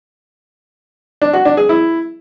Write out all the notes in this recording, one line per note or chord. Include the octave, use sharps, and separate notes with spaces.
D4
F#4
D4
G#4
E4